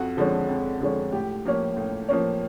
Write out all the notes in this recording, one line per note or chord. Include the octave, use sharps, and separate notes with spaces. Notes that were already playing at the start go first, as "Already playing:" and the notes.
Already playing: F2 F#4
D3 F3 G#3 C#4
F2
D3 F3 G#3 C#4
A2 G4
F3 A#3 C#4
A2
F3 A#3 C#4